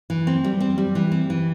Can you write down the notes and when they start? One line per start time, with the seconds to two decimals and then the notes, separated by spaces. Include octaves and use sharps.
0.10 E3
0.27 C4
0.44 G3
0.60 C4
0.78 G3
0.95 E3
1.12 C4
1.30 E3